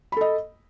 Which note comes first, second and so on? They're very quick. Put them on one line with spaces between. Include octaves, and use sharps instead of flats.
B5 A4 D#5